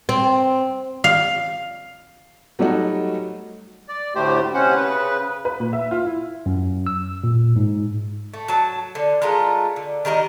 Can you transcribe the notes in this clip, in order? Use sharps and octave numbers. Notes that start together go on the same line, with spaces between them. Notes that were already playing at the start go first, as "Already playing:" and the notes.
C4
F5
F#3 G3 A3 D#4 F#4
D5
D2 A2 A3 G4 C5
C3 C#4 C5 F#5
C#3 B4
B4
A#2
E5
F4
E4
F#2
E6
A#2
G#2
A3
F#3 A5
D3
G#3 A3 F4 A#4
D3
D#3 G3 A#4 D#5